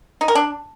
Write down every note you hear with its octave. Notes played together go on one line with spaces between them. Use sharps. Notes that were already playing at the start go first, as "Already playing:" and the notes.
D#4
A#4
D4